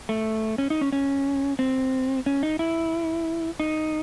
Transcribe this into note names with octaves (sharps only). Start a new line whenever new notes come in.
A3
C#4
D#4
C#4
C#4
C4
C#4
D#4
E4
D#4